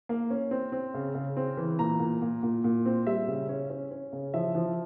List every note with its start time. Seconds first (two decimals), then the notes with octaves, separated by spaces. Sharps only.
0.09 A#3
0.30 C#4
0.51 C4
0.72 C4
0.94 C#3
1.15 C#3
1.37 C4
1.57 E3
1.79 A#2 A#5
2.00 A#2
2.22 A#2
2.43 A#2
2.64 A#2
2.85 C4
3.07 G3 E5
3.28 C#3
3.49 C#4
3.70 C#4
3.91 C#4
4.13 C#3
4.34 F3 E5
4.55 F3